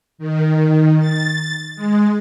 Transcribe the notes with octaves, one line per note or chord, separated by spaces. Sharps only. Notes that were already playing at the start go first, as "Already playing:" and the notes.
D#3
A6
G#3